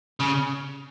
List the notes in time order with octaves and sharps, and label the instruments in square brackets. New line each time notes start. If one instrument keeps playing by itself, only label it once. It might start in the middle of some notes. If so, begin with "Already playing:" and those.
[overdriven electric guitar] C#3